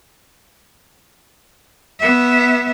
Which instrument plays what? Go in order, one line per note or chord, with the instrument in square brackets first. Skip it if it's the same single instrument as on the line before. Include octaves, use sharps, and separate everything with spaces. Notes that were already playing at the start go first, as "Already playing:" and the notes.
[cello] B3 E5